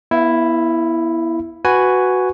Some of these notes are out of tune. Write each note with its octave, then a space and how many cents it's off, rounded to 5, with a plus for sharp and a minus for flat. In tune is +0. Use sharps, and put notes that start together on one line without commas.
B3 -20 E4 +0 F5 -35
F#4 +0 B4 +5 G#5 +0